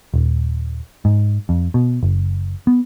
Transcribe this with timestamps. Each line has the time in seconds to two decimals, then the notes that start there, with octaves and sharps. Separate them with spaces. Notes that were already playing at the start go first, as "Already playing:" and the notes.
0.14 D#1
1.05 G#2
1.49 F2
1.74 B2
2.03 F#1
2.67 B3